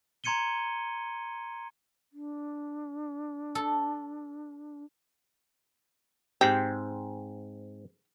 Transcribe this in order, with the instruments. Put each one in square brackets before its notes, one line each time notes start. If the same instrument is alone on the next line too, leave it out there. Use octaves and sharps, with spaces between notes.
[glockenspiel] A#5 C6 G#6 C#7 D#7 G7
[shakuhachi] D4
[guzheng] A4
[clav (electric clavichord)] G#2 C4 [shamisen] G4